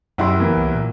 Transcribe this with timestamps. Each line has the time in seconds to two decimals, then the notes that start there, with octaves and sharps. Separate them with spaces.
0.18 B1 F#2 E4 G4 F#5 C6
0.40 E3 A#3 B3
0.57 C2
0.75 A#2